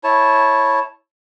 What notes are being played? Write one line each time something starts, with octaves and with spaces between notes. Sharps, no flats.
E4 C#5 A5